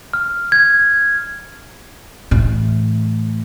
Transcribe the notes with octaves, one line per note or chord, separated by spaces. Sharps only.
F6
G#6
A2 E3